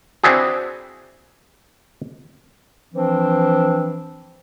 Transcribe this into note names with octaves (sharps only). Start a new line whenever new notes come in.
C4 D4 E4 F#4 G#4
E3 F3 C4 D4